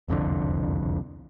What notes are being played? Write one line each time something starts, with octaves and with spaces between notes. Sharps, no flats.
E1 C2 F2 D3